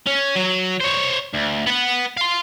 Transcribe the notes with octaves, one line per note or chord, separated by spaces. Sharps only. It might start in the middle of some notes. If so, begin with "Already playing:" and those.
C#4
F#3
C5 C#5
D2
B3 F#5
F5 C6